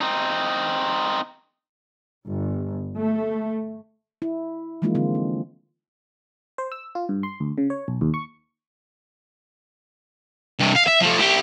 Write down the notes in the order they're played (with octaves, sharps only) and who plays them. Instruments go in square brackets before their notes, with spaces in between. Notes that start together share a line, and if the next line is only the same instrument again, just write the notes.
[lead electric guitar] C4 D#4
[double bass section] G1
A3
[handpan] E4
E3 F3 G#3 A#3 D#4 F4
D3 C4 F4
C4
[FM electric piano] C5
E6
F4
G2
C6
D2
C#3
C#5
B1
D#2
C#6
[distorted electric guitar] G2 C3
F5
E5
F3 A3
E4 G4